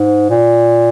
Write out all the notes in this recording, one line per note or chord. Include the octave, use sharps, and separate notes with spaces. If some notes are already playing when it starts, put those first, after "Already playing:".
Already playing: G#2
A#2